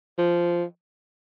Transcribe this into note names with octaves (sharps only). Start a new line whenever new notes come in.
F3